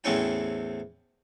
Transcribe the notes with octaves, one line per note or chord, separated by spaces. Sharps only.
E2 A2 C4 C#4 E4 G5